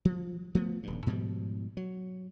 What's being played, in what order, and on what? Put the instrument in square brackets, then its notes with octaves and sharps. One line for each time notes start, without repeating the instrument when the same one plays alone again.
[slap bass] F3
F3 A3 B3
D#1 G2
G#2 B2 F3 G3
F#3